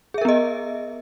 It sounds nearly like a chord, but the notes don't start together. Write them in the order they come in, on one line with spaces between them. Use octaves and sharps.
G#4 E5 A#4 B3 D#5